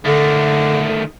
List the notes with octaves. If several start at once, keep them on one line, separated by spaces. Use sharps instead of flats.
D3 D#3 A3